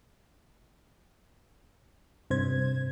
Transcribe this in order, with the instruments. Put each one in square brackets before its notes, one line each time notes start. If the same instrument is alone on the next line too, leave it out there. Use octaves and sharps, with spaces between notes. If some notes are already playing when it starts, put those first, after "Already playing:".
[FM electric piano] G2 C3 C5 G#6